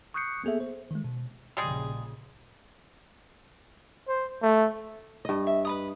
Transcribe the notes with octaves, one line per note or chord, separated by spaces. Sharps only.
C#6 D#6 F#6 G6 C7 C#7
A#3 B3 G#4 A4 E5
C5
D#3 G#3
B2
A#1 A#2 C#3 G3 G#3 G#4
C5
A3
G2 D#5
E5
B4 B5 D#6